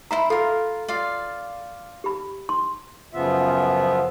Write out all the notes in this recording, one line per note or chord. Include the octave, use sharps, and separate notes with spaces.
E4 C5 E5 A#5 B5
F4 A4 A#4
F4 D5 F5
G4 B5
C6
F#2 C#3 F3 B3 F4 E5